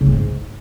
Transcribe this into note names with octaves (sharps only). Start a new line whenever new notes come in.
C#3
G#3
G#2